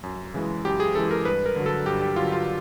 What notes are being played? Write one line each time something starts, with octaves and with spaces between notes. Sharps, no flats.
F#2
C#3 E3 G#3
F#2 G4
G#4
C#3 E3 G#3 A4
A#4
G2 B4
A#4
D3 F#3
A4
G2 G4
G4
D3 F#3 F4
F4